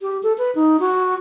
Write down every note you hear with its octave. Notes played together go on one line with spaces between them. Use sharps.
G4
A4
B4
D#4
F#4